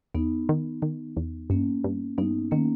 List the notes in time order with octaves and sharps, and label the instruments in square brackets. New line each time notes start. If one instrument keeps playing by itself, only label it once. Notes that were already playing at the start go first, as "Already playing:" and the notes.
[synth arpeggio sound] E2 [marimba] B3 D#4
[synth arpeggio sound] D#3
D#3
E2
[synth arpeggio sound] G2 [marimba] A#3 C#4
[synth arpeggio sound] G2
[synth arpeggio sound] G2 [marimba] B3 D#4
[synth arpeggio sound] D#3 [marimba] A#3 C#4